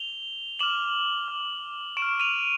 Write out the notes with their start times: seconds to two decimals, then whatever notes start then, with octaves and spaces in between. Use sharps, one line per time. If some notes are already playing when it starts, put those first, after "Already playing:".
Already playing: F7 G7
0.59 D6 F6 E7 F#7
1.28 D6 F6
1.97 C#6 D7 E7
2.02 F6
2.20 D#7 F7